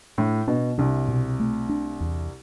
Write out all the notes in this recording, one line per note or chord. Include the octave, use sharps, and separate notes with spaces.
A2 D4
B2 D4
C2 C3 D4
B2
A3
D4
E2